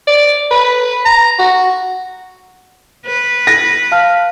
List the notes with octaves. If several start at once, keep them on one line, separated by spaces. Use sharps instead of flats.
D5
B4
A#5
F#4
B4
A#6
F5 A5 F6